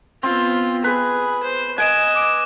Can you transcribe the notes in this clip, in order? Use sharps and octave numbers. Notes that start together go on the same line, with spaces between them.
B3 C4 F4
G#4 B4
C5
D#5 G#5 F#6 D7 E7
D6 D7